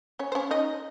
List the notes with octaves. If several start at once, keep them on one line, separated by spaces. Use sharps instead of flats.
C#4 C#5
C5
C#4 C#5
D#4 D#5